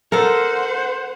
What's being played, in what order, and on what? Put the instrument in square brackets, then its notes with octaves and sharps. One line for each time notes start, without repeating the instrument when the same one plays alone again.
[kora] A4 A#4 [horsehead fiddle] C5 F#5